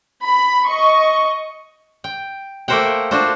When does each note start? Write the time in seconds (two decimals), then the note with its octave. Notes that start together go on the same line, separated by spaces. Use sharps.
0.25 B5
0.68 D#5 C#6
2.04 G5
2.68 A3 A#3 A#4 C5 F#5 G5
3.11 D4 F4 F#4 C5